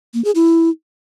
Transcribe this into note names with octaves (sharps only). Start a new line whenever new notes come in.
A#3
G#4
E4